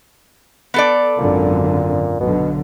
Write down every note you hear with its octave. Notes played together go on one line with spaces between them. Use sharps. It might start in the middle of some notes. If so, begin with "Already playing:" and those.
B3 A4 D5
G#1 F#2 A#2 D3
B1 B2 D3